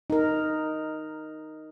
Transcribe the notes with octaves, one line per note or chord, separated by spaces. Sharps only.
D#4 A#4